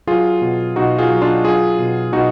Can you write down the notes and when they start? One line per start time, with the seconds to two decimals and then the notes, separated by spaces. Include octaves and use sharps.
0.07 F#3 F4 G#4
0.41 B2
0.76 B2 D#4 F#4
0.98 F4 G#4
1.10 F#3
1.22 D4 F4
1.44 F#3 F4 G#4
1.79 B2
2.12 B2 D#4 F#4